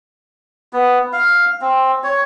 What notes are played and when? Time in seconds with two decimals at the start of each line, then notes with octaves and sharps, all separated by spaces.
0.73 B3
1.13 F5
1.61 C4
2.04 C#5